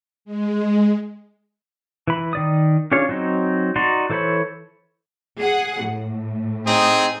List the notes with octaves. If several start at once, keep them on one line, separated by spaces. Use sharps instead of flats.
G#3
E3 B5
D#3 D5 D#6
C#4 D4 F4 G#4 C#5
F#3 C4 D#4
D#4 F#4 D5 A#5 C6
E3 A4 C5 C#5 B5
G#4 F#5
A2
C4 D#4 G#4